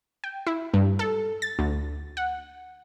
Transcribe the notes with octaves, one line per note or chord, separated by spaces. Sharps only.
G5
E4
G2
A4
A6
D2
F#5